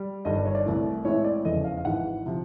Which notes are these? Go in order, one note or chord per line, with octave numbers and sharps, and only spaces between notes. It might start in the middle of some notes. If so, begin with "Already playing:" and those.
Already playing: G3
G1 G2 D#3 D#5
D5
C#5
D5
C2 C3 E3 A3
A2 E3 G#3 C4 C#5
D5
F1 E2 C#3 D#5
F5
F5
G#1 G#2 E3 F#5
C3 F3